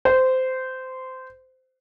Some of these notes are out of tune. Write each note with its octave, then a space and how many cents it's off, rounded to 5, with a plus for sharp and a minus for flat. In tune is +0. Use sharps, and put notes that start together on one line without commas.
C5 -15